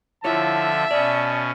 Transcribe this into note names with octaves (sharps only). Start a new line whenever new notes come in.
D3 F3 E4 F4 C#5 E5 A5
B2 C#4 D5 A5